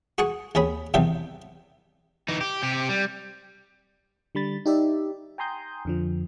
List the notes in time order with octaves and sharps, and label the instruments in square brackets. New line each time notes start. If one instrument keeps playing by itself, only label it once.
[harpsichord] F#4 G#4 G#5 C#6
D#2 C#4 G#4 B5
B1 E2 C3 D#3 E5 G5
[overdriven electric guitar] E3 D#4
G4
C3 G4
G3
[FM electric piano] D3 G3 B5 A6
D#4 G4 D5 E5
G5 G#5 A#5 C6 D#6 G6
F2 D3 F3